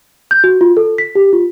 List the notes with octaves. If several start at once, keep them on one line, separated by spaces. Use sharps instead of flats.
G6
F#4
F4
A4
B6
G4
F4